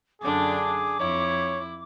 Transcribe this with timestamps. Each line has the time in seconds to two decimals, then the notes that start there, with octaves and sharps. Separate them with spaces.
0.21 F#2 D3 D4 G#4 D6
1.00 F2 E4 C#5